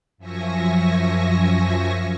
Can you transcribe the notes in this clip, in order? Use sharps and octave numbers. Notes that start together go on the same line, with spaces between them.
F#2 F3 E5 G#5 C#6 A#6